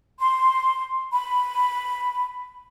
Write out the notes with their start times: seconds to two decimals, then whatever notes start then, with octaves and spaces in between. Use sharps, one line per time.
0.19 C6
1.12 B5